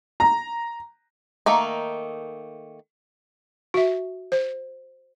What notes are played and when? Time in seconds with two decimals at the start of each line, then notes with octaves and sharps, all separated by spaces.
0.20 A#5
1.46 D#3 A3 A#3 D#4
3.74 F#4 E5
4.32 C5